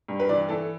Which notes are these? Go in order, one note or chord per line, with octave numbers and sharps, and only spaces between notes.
G2
B4
E3 D5
E3 A4